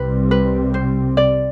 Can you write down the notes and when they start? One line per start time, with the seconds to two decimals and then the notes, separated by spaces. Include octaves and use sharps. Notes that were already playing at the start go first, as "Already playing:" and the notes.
Already playing: C2 C3 G3 C4 B4
0.31 B4
0.74 C5
1.17 D5